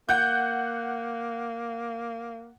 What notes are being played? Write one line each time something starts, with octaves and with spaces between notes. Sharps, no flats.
A#3 F#5 F#6 G6